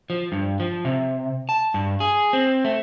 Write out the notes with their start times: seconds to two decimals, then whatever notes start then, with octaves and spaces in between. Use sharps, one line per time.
0.10 F3
0.32 G2
0.60 F3
0.85 C3
1.49 A5
1.74 G2
2.00 G#4
2.33 C4
2.65 A3